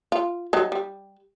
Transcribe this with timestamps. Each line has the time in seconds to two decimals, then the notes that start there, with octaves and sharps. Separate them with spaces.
0.12 F4
0.53 F#3 G3 D#4
0.72 G3